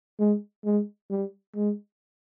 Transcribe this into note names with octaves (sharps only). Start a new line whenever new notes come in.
G#3
G#3
G3
G#3